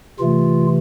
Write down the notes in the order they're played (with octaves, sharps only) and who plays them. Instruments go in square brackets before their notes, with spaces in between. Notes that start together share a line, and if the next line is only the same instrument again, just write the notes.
[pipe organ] C3 E3 A3 F4